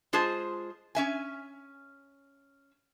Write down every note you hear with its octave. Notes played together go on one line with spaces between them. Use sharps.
G#3 F4 G#4 C5 A5
C#4 E5 G#5